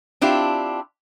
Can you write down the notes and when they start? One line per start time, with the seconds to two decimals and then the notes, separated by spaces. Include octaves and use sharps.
0.21 C4 D4 E4 F4 G4